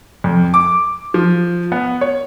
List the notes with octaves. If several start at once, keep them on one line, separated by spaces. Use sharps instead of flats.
F2
D6
F3
B3
C#5